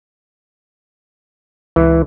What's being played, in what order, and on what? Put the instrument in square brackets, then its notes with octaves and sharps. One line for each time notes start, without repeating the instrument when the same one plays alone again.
[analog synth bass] C#2 [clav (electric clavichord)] E3